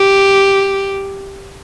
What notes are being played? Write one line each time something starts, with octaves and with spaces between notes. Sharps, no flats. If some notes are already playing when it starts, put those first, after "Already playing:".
Already playing: G4